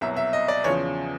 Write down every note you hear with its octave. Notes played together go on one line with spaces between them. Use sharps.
C2 B2 F#3 E5
E5
D#5
D5
E2 C#3 F3 C#5